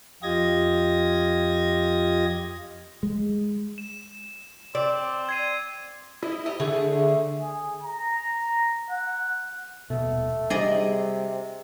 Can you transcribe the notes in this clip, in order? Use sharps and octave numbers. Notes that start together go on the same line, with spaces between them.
F2 F4 G4 D#5 G#6 A#6
G#3
E7
C4 D5
G#6 C7 D#7
E4 D#5
G4 D#5
D3 A3 G#4
G#4
A#5
F#5
D#1 B2 A3
C3 G3 G#4 D5 D#5